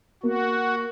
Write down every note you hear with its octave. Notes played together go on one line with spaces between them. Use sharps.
A#3 F#4